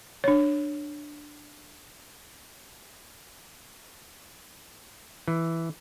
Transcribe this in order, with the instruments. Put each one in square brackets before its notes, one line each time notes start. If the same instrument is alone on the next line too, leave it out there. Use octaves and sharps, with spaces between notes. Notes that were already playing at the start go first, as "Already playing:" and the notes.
[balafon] D4 C#5
[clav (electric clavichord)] E3